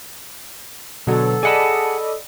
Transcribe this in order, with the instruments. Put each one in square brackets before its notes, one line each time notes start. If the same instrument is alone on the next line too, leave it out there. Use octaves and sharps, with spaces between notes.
[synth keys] B2 D3 F#3 [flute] A4
[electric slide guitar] G#4 F#5 A5 [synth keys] D5 D#5 B5